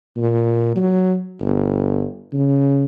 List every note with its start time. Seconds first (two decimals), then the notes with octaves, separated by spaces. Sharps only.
0.17 A#2
0.76 F#3
1.40 G1
2.33 C#3